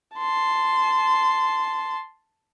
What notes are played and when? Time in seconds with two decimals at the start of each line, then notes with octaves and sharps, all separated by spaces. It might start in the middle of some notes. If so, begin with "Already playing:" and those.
0.17 A5 C6